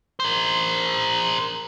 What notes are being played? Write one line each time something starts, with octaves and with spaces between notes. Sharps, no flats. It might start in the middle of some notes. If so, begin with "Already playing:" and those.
A#4 C5